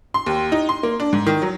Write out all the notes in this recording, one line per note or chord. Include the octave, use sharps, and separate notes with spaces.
C6
D#2
D#4
C6
A#3
D4
G#2
D#3
F#3